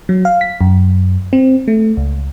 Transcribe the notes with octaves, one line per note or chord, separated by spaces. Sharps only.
F#3
F5
B6
F#2
C4
A3
C#2